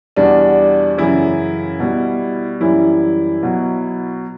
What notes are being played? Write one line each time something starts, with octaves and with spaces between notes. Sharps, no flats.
E2 B2 G3 D4
F#2 C#3 E3 E4
B2 G3
F#2 E3 G3 E4
B2 F#3